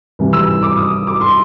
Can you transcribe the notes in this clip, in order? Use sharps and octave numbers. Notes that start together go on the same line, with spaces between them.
C2 C3 E3
E6
D6
D#6
D6
C6